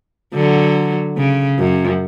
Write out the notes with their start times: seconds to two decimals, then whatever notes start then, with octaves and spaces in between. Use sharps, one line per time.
0.34 D3 F#3
1.17 C#3
1.59 F#2